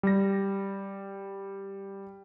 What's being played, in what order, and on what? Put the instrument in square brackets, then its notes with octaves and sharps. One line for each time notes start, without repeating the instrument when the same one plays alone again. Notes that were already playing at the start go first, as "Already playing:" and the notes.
[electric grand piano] G3 A#6